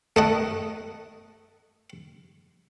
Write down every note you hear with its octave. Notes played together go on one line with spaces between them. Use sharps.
A3 D#5 F#5